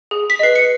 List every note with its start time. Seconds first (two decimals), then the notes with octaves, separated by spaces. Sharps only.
0.11 G#4
0.30 B6
0.39 B4 D#5 C7
0.56 C#7